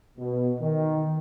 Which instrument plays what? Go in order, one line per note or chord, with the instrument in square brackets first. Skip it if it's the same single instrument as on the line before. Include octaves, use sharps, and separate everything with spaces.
[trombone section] B2
D#3